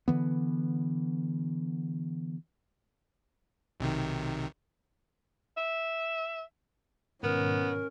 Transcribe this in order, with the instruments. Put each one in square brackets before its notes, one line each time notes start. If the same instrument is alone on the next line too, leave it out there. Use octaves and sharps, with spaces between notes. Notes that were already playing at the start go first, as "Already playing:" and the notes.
[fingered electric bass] D3 E3 B3
[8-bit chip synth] B1 C3 D#3
[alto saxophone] E5
[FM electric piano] G#2 B2 D#3 [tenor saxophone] B3 [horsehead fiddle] C#4 [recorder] A#4